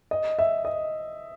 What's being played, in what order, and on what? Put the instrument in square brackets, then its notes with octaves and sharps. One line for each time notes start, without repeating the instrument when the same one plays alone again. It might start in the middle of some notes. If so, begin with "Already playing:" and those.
[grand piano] D#5
E5
D#5